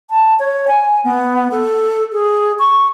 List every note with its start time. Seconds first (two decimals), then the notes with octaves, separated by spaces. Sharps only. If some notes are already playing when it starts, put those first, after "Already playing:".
0.10 A5
0.39 C#5
0.68 G#5
1.04 B3
1.51 A4
2.12 G#4
2.59 C#6